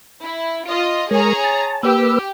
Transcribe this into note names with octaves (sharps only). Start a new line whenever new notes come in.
E4
F4 D#5
G#3 G#4 A#4 C#5 A#5
A5
A#3 G4 B4 E6